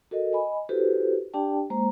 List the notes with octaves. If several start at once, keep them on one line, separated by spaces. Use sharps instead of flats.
F#4 A4 A#4 D#5
D#5 G#5 B5
E4 F#4 G4 A4 B4 C5
D4 G4 D5 G5 A5
G#3 A#3 C5 A#5